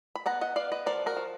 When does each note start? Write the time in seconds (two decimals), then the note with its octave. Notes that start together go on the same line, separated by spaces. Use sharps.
0.15 B5
0.26 B3 F#5 A#5
0.41 D#5 F#5
0.56 B3 D5 F5
0.72 B4 D#5
0.86 F3 A#4 D5
1.06 F#4 A#4
1.17 F3